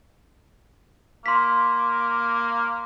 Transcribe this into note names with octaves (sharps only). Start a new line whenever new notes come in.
A#3 C6 B6